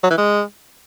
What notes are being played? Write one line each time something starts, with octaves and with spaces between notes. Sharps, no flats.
F#3
E3
G#3